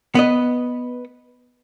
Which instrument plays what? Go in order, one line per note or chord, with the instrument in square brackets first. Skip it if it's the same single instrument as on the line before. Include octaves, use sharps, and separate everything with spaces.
[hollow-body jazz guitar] B3 B4 D#5